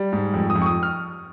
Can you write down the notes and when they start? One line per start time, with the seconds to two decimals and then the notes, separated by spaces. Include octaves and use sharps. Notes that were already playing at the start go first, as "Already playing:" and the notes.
Already playing: G3
0.13 G#2
0.34 F2
0.50 D#6
0.56 F2
0.62 C#6
0.66 D#6
0.83 F6